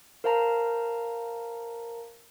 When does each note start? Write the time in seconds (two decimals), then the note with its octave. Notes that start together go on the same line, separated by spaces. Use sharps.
0.24 A#4 C5 F5 A5 A#5